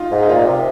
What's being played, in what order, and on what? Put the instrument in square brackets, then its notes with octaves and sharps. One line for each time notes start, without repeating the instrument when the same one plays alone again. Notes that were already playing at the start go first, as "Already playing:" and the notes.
Already playing: [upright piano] D#4 F4
[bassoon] G#2
[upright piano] D#4
[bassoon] A#2 [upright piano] F4
[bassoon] C3